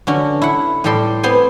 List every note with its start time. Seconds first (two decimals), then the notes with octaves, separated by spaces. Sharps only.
0.07 D3 C#4 F#4
0.42 E4 F#5
0.84 A2 G3 G4 A4 C6
1.23 B3 C4 C5 G#5